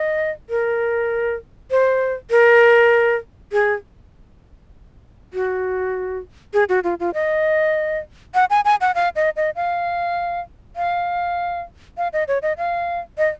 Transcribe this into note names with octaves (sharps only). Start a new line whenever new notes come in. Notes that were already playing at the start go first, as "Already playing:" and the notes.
Already playing: D#5
A#4
C5
A#4
G#4
F#4
G#4
F#4
F4
F4
D#5
F#5
G#5
G#5
F#5
F5
D#5
D#5
F5
F5
F5
D#5
C#5
D#5
F5
D#5